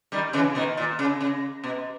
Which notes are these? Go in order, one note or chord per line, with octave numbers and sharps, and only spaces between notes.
D#3 G3
C#3 E3
B2 D#3
A#2
C#3
C#3
B2